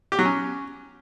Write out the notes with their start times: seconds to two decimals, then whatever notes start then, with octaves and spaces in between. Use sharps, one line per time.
0.12 G4
0.19 F#3
0.25 C#4